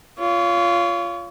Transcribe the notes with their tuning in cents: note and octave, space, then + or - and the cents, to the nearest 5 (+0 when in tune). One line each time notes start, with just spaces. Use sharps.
F4 -10 C#5 +35